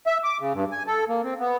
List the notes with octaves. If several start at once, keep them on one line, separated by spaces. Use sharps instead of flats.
E5
D6
C#3
G2
G#5
A4
A#3
C4
B3